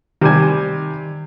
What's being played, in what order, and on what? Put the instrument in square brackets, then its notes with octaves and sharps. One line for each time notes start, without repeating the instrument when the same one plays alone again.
[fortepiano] C3 G3 G#5 [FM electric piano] D#3